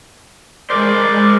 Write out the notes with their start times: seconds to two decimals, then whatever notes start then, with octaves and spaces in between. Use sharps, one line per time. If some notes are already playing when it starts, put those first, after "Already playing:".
0.70 G#3 A#4 C5 D5